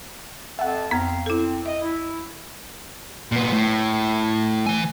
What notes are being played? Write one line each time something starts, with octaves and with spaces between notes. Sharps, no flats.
F2 E5 F#5 A5
F2 B3 C4 F5 A#5
C4 E4 A4
D#5 E5
E4
A#2 B3
A2
E3 G#5